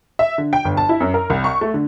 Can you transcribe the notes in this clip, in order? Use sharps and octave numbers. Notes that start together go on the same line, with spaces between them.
E5
D3
G5
G1
A5
E4
F#2
A#4
C2
C#6
A3
D3